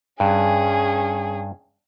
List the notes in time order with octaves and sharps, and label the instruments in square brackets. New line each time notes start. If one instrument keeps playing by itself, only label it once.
[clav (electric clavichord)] G2 [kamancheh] C#4 G#4